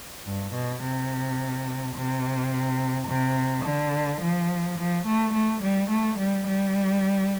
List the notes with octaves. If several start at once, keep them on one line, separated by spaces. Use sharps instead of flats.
G2
B2
C3
C3
C3
D3
F3
F3
A3
A3
G3
A3
G3
G3